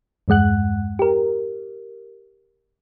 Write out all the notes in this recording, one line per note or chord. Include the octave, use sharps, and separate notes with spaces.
E2 G2 G#3 F#5 F#6
G4 A#4